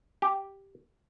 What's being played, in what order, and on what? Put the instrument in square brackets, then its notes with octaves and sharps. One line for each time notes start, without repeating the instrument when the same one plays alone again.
[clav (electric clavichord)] G4